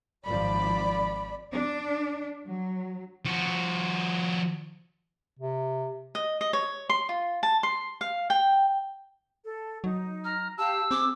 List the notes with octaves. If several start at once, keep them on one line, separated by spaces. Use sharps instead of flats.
G#1 F3 D5 B5
D4
F#3
F3 F#4
C3
D#5
D#5
C#5
C6
F4
A5
C6
F5
G5
A4
F#3 D#4
A#5 F6
G4 F5 A5 E6
C4 G#4 D6